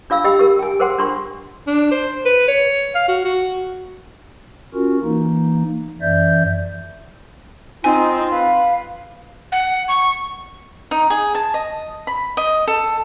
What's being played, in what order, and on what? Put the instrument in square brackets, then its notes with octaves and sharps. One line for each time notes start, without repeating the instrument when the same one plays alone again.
[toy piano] D4 F4 F5 E6
G4 D#5 G5 B5 E6
G4 A#4
G5 G#5
G#4 A#4 C5 F#5 G5 C6
D4 F4 C6 C#6
[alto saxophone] D4
C5
B4
C#5
F5
F#4
F#4
[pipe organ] C#4 F4 F#4 A#4
E3 A#3 D#4
F#2 E3 D5 E5 G6
[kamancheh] C4 [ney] D#4 [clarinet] F4 [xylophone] G#5
[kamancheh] B4 [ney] F5
[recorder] F#5
C#6
[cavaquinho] D#4
G#4
A5
D#5
B5
D#5
A4